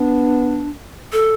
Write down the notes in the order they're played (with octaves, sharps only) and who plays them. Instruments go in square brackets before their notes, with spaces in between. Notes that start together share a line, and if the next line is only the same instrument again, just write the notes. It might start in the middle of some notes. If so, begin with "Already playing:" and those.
Already playing: [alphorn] B3 [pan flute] D4
[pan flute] A4